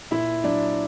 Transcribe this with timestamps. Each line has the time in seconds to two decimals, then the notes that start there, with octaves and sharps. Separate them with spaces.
0.11 A#2 E4 E5
0.44 F#3 D4 D5